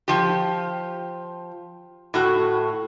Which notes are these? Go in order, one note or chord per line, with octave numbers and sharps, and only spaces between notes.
F3 G4
A2 F#4